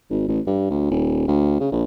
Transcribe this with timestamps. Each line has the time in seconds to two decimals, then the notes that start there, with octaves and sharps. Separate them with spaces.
0.10 G#1
0.28 A1
0.47 G2
0.70 D2
0.91 D#1
1.27 D2
1.60 C#3
1.72 A#1